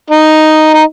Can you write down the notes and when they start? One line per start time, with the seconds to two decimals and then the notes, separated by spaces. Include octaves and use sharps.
0.11 D#4
0.74 D#4